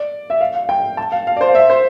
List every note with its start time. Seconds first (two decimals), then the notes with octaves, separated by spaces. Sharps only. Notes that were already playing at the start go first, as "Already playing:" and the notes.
Already playing: D5
0.30 E5
0.41 F5
0.54 F5
0.69 G5
0.97 A5
1.12 F5
1.27 F5
1.37 D5
1.41 C5
1.48 F5
1.55 E5
1.70 C5